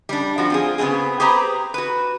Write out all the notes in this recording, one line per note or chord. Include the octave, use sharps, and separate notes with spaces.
G3 D4
F3 F#4
C4 F4 G#4
C#3 B3 C4 E4 G#4
G4 G#4 B4 C5 A#5
F#4 B4